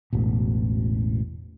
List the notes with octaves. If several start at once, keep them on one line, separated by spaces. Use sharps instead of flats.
E1 A1 B2